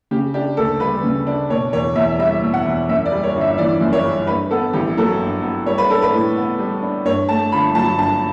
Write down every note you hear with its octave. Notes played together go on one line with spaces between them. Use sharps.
C#3 G4
D4 G4
D2 A4
G3 B4
C#3
D4
B2 C#5
E2 C#5
E2 E5
G3 E5
B2
F#5
E2
F#2 E5
D5
G3
C#5
G1
E5
E3 D5
F#2
C#5
G3
G2 B4
B3 A4
A1 G4
F#3 A4
G2
B3
G3 C#5
B4
D4 A4
B4
A2
B3
G3
D4
G2 C#5
A3 A5
G1 B5
F#3 A5
G2 A5